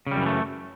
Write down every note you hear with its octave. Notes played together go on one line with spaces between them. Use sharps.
F#2 C#3 E3 G3 A3